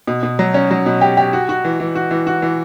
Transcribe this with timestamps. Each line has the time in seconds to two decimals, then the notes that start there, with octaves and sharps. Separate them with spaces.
0.07 B2
0.23 B2
0.39 F#3
0.54 C#4
0.71 F#3
0.86 B2
1.01 G4
1.17 G4
1.33 F#4
1.49 F#4
1.65 E3
1.80 E3
1.95 F#4
2.11 E3
2.27 F#4
2.42 E3